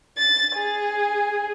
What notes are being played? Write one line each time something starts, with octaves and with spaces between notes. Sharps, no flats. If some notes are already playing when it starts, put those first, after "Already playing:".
A6
G#4